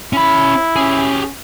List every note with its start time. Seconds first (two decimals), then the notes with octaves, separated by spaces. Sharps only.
0.13 C#4 E4 B5
0.76 C#4 G4 G#4